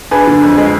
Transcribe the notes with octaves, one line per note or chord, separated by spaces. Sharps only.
D4 G#4 B4
D3
F2
G#3